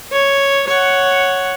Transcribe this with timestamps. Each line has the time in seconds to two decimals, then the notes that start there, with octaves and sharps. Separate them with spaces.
0.12 C#5
0.67 C#5 F#5